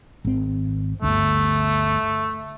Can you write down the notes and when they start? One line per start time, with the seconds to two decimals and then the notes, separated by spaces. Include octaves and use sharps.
0.25 G#1 C4
1.02 G1 D2 A3